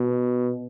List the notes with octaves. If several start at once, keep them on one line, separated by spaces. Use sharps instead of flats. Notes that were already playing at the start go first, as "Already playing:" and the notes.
Already playing: B2